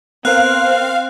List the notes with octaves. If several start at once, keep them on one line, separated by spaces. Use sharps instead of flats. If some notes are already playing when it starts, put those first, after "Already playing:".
B3 C4 A#4 C5 F5 F#6